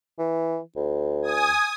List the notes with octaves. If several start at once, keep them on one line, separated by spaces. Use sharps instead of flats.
E3
D2
G#5 D#6